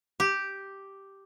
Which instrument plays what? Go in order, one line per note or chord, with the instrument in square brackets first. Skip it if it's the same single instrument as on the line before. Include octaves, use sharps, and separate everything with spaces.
[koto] G4